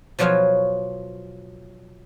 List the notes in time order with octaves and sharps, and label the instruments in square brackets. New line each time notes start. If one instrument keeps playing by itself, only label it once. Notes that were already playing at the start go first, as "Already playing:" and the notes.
[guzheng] B2 F3 F#3 F4 C#5 F5